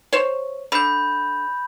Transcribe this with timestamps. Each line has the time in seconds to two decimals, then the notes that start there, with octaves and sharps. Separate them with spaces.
0.13 C5 C#5
0.72 D3 B5 G6